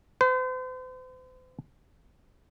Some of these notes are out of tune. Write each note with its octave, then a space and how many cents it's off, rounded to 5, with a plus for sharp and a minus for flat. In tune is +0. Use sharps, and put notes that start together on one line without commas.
C5 -45